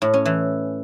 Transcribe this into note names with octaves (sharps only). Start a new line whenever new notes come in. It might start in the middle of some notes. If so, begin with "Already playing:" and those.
A2
C#4
E3